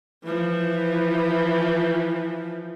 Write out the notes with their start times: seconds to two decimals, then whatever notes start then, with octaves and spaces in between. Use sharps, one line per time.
0.24 E3 F3